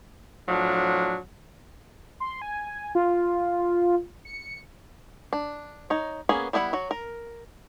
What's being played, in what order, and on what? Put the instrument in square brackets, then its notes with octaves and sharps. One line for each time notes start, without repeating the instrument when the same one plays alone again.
[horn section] A2 F3 F#3 D4
[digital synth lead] C6
G#5
F4
C#7
[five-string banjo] D4
D#4 C#5
A#3 B3 C#4 G#4
G3 B3 E4 F#4 F#5
F#3 F#4
A#4